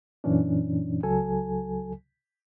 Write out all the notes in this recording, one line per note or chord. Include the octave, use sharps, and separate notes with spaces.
F#2 A#2 E3 C#4 D4
C#2 F#3 A4 G#5